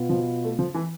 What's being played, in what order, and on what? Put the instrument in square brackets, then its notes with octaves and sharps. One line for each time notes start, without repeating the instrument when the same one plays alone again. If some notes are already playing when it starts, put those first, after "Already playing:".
Already playing: [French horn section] B2 B3 F4
[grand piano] F3
A3
F3
E3